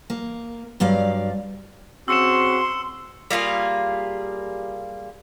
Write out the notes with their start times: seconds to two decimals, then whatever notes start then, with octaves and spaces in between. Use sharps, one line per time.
0.10 A#3
0.80 G2 F#3 D5 F5
2.08 C#3 C4 F#4 C6 E6 C#7 E7
3.30 G3 A#3 F4 G#4